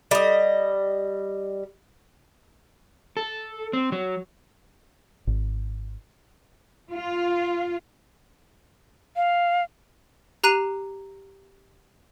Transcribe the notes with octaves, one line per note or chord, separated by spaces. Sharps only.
G3 D#5
A4
C4
F#3
G#1
F4
F5
G4 A#5 F#6 C7 D#7 F7